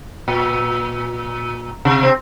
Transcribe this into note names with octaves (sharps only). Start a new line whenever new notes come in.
A#2
C3
C4